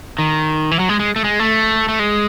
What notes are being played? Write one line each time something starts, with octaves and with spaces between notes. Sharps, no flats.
D#3
E3
F#3
G#3
G#3
A3
G#3
A3
A3
G#3